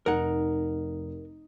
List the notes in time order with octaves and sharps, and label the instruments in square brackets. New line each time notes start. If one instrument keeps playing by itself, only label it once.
[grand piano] F1 [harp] D#4 [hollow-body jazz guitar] A#4 F#5